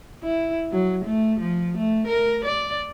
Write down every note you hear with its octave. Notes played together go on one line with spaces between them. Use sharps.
E4
F#3
A3
F3
A3
A#4
D5